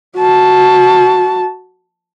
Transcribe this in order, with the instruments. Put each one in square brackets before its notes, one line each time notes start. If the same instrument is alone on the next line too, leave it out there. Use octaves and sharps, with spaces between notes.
[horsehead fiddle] F#4 A5